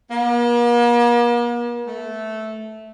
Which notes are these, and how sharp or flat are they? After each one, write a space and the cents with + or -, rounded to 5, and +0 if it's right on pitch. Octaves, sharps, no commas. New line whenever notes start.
A#3 +45
A3 -10